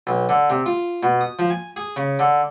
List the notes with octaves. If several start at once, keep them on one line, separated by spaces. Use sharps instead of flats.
B1
D3
C3
F4
B2
D#6
F3
G#5
G#4
C#3
D3